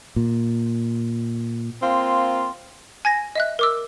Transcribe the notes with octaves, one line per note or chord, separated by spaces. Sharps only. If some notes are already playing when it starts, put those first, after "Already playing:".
A#2
A#3 C4 F4
G#5 G#6 A#6
D#5 E5 F#6
A#4 D6 E6